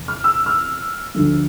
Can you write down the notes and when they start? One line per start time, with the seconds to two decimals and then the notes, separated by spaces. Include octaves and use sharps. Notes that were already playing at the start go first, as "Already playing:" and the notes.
Already playing: E2 C3
0.08 F6
0.24 E6
0.46 F6
1.14 D2 D3 F3 A3